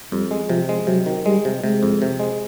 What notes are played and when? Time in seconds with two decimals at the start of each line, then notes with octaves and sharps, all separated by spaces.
0.12 F2 G3
0.31 G#3
0.49 C3 F3
0.69 G#3
0.87 C3 F#3
1.06 D#3
1.26 G3 G#3
1.45 C3
1.64 C3 G#3
1.83 F2
2.02 C3
2.20 G#3